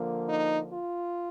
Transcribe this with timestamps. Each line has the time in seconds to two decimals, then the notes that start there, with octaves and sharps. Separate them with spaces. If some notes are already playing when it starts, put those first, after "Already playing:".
Already playing: D3 F3 A#3
0.28 D#4
0.72 F4